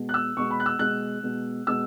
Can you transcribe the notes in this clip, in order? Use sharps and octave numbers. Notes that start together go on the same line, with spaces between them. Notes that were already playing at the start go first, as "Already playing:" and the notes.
Already playing: B2 G#3
F#6
E6
B2 G#3 C#6
B5
F#6
E6
B2 G#3 F#6
B2 G#3
B2 G#3 E6